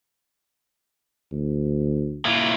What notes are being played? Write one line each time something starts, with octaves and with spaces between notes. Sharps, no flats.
D2
A#2 A#3 E4 F4